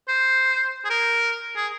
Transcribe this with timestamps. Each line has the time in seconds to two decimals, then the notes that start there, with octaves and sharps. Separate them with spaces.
0.09 C5
0.85 G#4
0.90 A#4
1.56 G#4